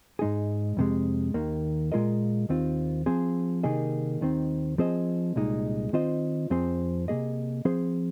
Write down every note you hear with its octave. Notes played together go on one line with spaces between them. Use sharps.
G#2 G#3 D#4 G#4
F2 C3 G#3
D#2 D#3 A#3
A#2 G#3 F4 A#4 D#5
D#2 D#3 C4 F4
F3 C4 G#4 C5
C3 D#3 A#3 G#4 D#5
D#2 D#3 C4
F3 C4 G#4 C5 D#5
C2 A#2 G#3 D#4
D#3 C4 F4 C5 D#5
F2 F3 C4 G#4 C5
C3 D#3 A#3 G#4 D#5
F3 C4 G#4 C5